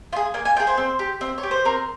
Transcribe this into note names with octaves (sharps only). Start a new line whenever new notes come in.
F4
G#4
A#3 G#5
G#5
F4 G5
G#4
C5
C4
G4
C4
C#5
G4
C5
C4 A#4